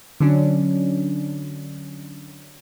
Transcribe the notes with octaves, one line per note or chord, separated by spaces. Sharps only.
D3 F#3 C#4 D4